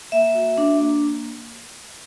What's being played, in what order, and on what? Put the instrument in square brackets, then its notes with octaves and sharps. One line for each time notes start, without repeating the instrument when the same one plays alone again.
[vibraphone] A#3 E5
F#4
D4
A#3